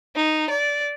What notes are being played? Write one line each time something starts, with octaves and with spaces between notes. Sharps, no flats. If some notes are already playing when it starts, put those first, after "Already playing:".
D#4
D5